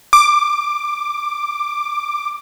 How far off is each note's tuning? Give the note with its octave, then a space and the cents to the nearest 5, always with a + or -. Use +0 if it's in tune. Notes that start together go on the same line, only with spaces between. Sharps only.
D6 +10